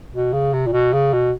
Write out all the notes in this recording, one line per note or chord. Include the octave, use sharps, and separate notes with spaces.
B2
C#3
C3
A#2
B2
C#3
B2